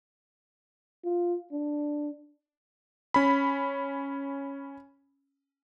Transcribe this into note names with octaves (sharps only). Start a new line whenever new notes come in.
F4
D4
C#4 B5